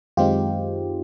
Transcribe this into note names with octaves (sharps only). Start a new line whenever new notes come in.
F#2 D#3 G#3 C4 D#4 F4 G4